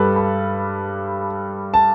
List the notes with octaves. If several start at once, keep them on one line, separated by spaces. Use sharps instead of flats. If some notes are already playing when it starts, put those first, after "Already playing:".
Already playing: G2 G3 A4 B4
B5
A5